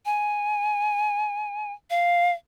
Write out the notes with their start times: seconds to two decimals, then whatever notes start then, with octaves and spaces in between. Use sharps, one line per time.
0.06 G#5
1.90 F5